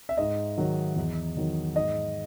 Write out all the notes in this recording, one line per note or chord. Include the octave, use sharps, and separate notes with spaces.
E5
G#2 D#5
D#3 F#3
E2
D#3 F#3
G#2 D#5